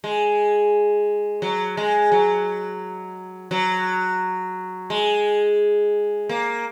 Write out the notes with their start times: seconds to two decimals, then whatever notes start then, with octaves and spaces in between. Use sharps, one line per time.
0.04 G#3
1.42 F#3
1.77 G#3
2.12 F#3
3.51 F#3
4.90 G#3
6.29 A#3